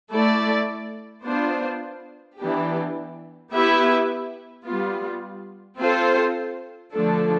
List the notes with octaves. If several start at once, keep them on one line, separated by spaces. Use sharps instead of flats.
A3 E4 A4 D5
B3 D4 F4 C5
E3 B3 D4 G4
B3 E4 G4 B4 E5
G3 B3 F4
C4 F4 A4 C5
D3 F3 A3 D4 A4